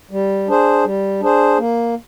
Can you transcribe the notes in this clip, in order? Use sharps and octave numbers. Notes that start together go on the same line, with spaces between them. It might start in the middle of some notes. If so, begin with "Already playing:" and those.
G3
D4 G#4 C5
G3
D4 G#4 C5
A#3